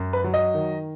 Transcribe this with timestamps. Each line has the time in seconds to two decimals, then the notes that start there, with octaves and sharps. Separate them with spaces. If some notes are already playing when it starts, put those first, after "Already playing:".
Already playing: F#2
0.13 B4
0.24 F#3
0.34 D#5
0.54 D#3